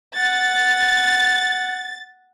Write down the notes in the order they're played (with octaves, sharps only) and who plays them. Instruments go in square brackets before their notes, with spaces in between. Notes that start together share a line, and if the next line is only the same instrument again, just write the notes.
[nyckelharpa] F#5 [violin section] A6